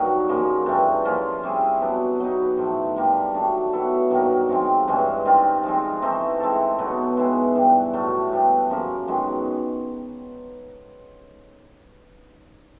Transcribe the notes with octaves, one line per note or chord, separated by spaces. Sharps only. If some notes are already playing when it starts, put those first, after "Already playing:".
Already playing: G2 D#3 F#3 A#3 D#4
F#2 C#3 F3 A#3
G2 E3 A3
F3 A#3 C#4 F4
G3 C4 E4 G#4
F#3 B3 D4
F#3 B3 D#4
A2 F3 A3
D3 G3 A#3
D#3 F#3 A3 D4
F#3 B3 E4 A4
G2 D#3 F#3 A#3
C3 F3 G#3 C4
G2 E3 G#3 C#4
D#3 G3 C4 F4
F3 G#3 C4
E3 A3 C4 D#4
G#3 C4 E4 A4
B2 F#3 B3 D#4
G#3 B3 E4 G#4
G2 E3 G3
A2 F#3 A3
G3 B3 D4
F#2 C#3 F3 A#3
F#2 D#3 G#3 B3